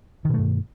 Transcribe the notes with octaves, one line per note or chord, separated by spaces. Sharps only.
G2 B2 D#3 A3